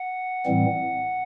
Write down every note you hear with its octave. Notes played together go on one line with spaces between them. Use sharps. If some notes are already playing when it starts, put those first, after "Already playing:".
Already playing: F#5
A2 E3 G3 C4